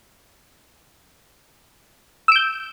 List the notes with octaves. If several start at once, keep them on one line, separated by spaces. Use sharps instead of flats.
E6 G6 D7